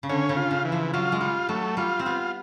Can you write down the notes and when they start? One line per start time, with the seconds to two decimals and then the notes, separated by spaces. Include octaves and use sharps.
0.03 C#3
0.09 D3 C#4
0.29 C#3
0.37 F4
0.51 C#3
0.65 E3
0.72 F3
0.93 F#3 F4
1.12 G#3
1.21 G3 F4
1.49 F#3 A3
1.77 G3 F4
1.99 C4
2.05 B3 F4